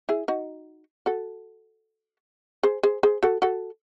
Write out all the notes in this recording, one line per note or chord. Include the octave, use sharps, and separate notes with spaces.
E4 G#4
D#4 F#4
F#4 A4
G#4 C5
G#4 C5
G#4 C5
F#4 A4
F#4 A4